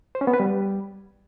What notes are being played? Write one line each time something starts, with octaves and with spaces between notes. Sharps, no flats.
C5
C#4
B3
B4
G3